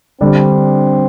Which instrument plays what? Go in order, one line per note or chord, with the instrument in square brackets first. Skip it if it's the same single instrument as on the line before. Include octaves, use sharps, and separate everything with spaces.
[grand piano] D3 G3 D4 [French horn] C4